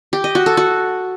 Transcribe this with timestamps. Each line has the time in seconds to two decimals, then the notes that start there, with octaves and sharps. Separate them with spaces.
0.13 G4
0.24 D#5
0.35 F#4
0.46 A4
0.57 F#4